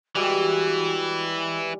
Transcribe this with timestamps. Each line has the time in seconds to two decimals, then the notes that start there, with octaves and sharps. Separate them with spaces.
0.16 E3 G3 G#3 F#4